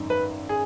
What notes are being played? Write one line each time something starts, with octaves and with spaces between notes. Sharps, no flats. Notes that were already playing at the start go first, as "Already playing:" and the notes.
Already playing: G#1 F#2 D#3
B4
G#4